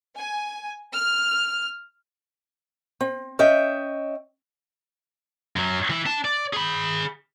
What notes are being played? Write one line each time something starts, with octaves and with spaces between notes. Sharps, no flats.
G#5
F6
C4
C#4 D#5 E5 G5
F#2 F#3
E3 E4
D4 A5
D5
G#4 B5